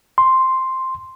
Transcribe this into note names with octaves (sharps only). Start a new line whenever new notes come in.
C6